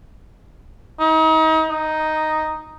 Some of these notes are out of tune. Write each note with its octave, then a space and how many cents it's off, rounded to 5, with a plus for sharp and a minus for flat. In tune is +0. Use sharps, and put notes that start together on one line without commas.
D#4 +35
D#4 +0